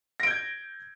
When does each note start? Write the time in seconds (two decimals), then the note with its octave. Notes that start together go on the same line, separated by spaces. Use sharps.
0.20 A#6
0.23 D7
0.27 G6
0.30 G#6